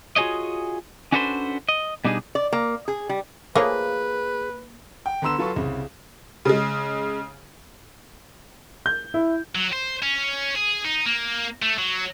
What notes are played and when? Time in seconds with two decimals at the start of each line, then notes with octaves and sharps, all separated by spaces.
0.16 F4 F#4 G#4 C#5 D#5
1.12 C#4 D4 F#4 A4 B4 C5
1.69 D#5
2.05 B2 G3 D4 D#4 G4 G#4
2.35 D5
2.53 A#3
2.88 G#4
3.09 G3
3.55 F3 A3 A#3 G#4 B4 C#5
5.06 G5
5.22 D3 B3 A#5 C6 E6 E7
5.38 F#3 F4 A4 B4 C6 C#6
5.56 C2 C#3
6.45 C#3 G#3
8.86 G6
9.14 E4
9.55 F#3
9.73 C5
10.02 C#4
10.55 G#4
10.85 D#4
11.06 A#3
11.62 A3
11.78 F#3